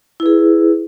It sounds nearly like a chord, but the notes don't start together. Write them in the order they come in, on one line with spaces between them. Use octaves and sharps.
E4 B4 G#4